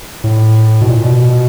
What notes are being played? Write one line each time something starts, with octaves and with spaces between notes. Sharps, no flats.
A2
B2
A#2
B2